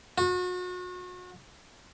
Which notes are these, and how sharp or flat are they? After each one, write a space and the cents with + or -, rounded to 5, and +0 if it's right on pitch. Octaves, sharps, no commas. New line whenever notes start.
F#4 -35